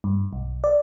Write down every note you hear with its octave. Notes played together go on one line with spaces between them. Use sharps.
G2
B1
D5